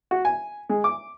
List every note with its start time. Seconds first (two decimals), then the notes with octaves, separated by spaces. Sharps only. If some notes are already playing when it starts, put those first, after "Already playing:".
0.11 F#4
0.25 G#5
0.69 G#3
0.84 D6